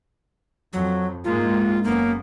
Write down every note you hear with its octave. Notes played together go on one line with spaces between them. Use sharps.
F2 F#3
G#2 G#3 A#3 F4
F#1 A#3 B3 C#4